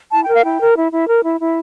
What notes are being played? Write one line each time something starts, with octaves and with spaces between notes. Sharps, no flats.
E4 A5
A#4 G5
F5
E4 G5
A#4
E4
E4
A#4
E4
E4